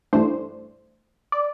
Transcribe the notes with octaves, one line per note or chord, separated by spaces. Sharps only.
G2 E3 A3 D4 C5
D5